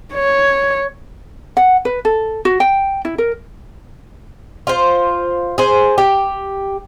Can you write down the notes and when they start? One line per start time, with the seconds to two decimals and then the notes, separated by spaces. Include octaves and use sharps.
0.14 C#5
1.57 F#5
1.85 B4
2.05 A4
2.45 F#4
2.60 G5
3.05 E4
3.18 A#4
4.67 F4 C5
5.58 G#4 C5
5.98 G4